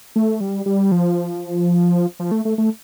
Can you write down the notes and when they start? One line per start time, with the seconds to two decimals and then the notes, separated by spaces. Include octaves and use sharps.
0.16 A3
0.40 G3
0.66 G3
0.92 F3
2.20 F3
2.31 A3
2.45 A3
2.58 A3